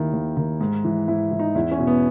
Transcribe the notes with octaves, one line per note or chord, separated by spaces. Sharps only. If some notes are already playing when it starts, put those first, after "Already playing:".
Already playing: D#2 D#3 E4
D#2
D#3
G#2
E3
G#2 E4
E3
D#4
E2 E4
C#4
B2
B3